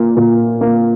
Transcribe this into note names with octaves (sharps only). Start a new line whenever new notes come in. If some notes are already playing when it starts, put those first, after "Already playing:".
Already playing: A#2 A#3
A#2
A#3